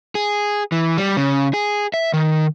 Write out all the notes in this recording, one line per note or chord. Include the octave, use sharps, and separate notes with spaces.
G#4
E3
G3
C#3
G#4
E5
D#3